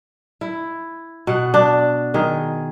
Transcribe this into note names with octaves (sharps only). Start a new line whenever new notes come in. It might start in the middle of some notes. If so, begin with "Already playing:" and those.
E4
B2 F#5
D4
D#3 G#4